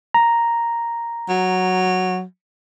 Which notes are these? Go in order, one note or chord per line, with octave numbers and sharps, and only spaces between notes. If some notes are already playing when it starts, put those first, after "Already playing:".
A#5
F#3